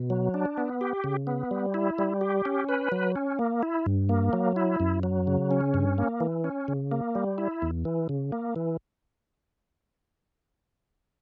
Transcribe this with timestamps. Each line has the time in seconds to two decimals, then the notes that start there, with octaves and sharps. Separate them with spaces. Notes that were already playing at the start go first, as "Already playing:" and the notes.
Already playing: B2
0.10 F#3
0.34 D4
0.57 B3
0.81 G4
1.04 C#3
1.27 B3
1.51 G3
1.74 E4
1.99 G3
2.21 G4
2.45 C#4
2.69 B4
2.92 F#3
3.16 C#4
3.39 A#3
3.63 E4
3.86 G2
4.09 A#3
4.33 F#3
4.56 E4
4.80 F#2
5.03 F#3
5.27 C#3
5.51 C#4
5.74 G2
5.98 A#3
6.20 E3
6.44 C#4
6.68 C#3
6.92 A#3
7.15 G3
7.38 E4
7.62 E2
7.85 E3
8.09 C#3
8.32 A#3
8.56 E3